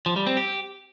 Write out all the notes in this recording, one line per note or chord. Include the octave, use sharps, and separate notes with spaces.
F3
G3
C4
G4